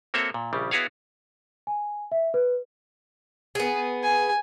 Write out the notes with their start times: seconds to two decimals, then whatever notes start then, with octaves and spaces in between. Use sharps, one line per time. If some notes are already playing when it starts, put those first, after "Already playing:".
0.14 A#3 C4 F#4 A4 C#5 E5
0.34 A#2
0.53 A#1 C#3 G3
0.71 B3 E4 F#4 G#4 C#5 F5
1.67 G#5
2.12 E5
2.34 B4
3.55 B3 G#4
4.03 G#5